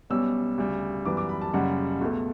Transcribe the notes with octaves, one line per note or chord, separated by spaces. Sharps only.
B1 B2 G3 C#4 E6
D2 C#3 G3
F#2 E3 G3 B3 D6
D6
B5
A5
F#1 F#2 C#3 G3 F#5
C#2 B2 A3